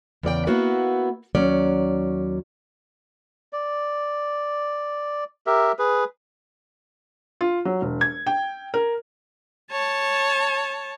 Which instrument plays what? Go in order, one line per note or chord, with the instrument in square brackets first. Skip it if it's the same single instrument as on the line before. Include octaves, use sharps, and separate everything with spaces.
[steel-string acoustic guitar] E2 C#3 D5 G5
A#3 B3 E4 F#4 B4
D#2 F#3 C#4 D5
[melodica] D5
G4 A#4 E5
G#4 B4
[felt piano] F4
F#3
E1
G#6
G5
A#4
[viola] C#5 A5